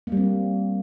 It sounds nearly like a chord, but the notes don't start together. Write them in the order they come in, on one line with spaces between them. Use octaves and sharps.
A#3 G3 C4